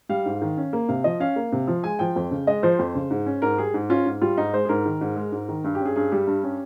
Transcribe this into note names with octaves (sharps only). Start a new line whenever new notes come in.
G3 F5
G#2
D#3
C#4
A#3
C3 F5
F3 D#5
C#4 F5
A#3
C3
F3
G#3 G#5
F3 G5
F2
C#3
G#3 D#5
F3 C5
F2
C#3
G#2
C#4
G#2 A#4
G3 G#4
G#2
C#4 F4
G#2
G3 F4
G#2 D#4
G#3 C5
G#4
G#2 A#4
D#3
G#2
G#3
G#2
D#3
G2
G4
C#4
G#4
G2 G#4
G3 G4
G2
C#4